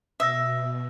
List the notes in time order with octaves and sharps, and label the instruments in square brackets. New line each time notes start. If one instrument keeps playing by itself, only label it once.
[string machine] B2 [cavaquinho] E5 [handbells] D#6 E6 A#6